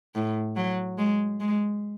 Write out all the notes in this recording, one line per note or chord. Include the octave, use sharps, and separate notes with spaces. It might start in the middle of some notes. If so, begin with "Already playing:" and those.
A2
F#3
G#3
G#3